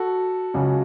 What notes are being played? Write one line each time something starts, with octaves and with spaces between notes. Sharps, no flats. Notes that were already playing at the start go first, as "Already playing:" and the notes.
Already playing: F#4 A4
C#2 C#3 F#3